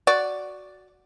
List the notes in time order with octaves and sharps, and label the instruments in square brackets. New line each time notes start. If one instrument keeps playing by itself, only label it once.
[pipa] F#4 D5